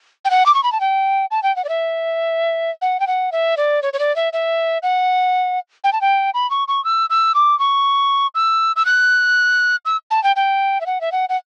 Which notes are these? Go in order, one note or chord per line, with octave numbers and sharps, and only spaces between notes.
G5
F#5
D6
C#6
B5
A5
G5
A5
G5
F#5
D5
E5
F#5
G5
F#5
E5
D5
C#5
C#5
D5
E5
E5
F#5
G5
A5
G5
B5
C#6
C#6
E6
E6
D6
C#6
E6
E6
F#6
E6
A5
G5
G5
E5
F#5
E5
F#5
F#5